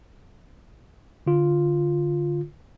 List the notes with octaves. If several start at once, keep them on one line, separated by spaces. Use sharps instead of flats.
D3 F4